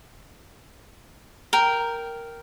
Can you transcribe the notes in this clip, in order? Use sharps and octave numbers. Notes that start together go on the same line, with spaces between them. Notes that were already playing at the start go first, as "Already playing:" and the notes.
A#4 G5